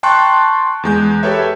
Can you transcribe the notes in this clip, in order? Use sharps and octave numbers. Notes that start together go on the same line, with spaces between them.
G5 A5 C6 C#6 F#6
E2 G#3 G6
G4 A4 B4 C#5 E5